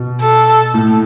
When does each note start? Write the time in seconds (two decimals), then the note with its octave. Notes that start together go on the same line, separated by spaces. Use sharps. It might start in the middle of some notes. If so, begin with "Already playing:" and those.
Already playing: B2
0.21 A4
0.74 A2